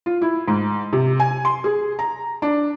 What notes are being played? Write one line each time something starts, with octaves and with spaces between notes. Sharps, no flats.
F4
E4
G#2
C3
G#5
C6
G#4
A#5
D4